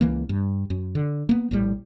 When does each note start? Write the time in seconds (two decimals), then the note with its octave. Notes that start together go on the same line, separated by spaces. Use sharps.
0.01 C#2 E3 A#3
0.29 G2
0.70 F#2
0.95 D3
1.29 A#3 B3
1.51 A#1 A2 C3 G3